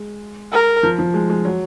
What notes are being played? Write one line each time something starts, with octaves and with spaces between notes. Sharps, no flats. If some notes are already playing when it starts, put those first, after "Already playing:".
Already playing: G#3
A#4
F3
F3
G#3
G#3
F#3